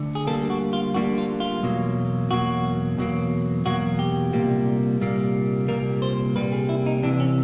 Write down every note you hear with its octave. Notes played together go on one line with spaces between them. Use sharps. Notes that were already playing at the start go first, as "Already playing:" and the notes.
Already playing: D2 D3
G#4
D2 D3 G3 A#3 A4
F#4
F4
D2 D3 G3 A#3 F#4
F4
F4
E2 B2 F#3 A#3
E2 B2 F#3 A#3 F#4
E2 B2 F#3 A#3
E2 B2 F#3 A#3 F#4
G4
C2 A#2 G3 A#3
C2 A#2 G3 A#3
C2 A#2 G3 A#3 A#4
C5
C2 A#2 G3 A#3 B4
G#4
E4
D#4
C2 C3 E3 D4
C#4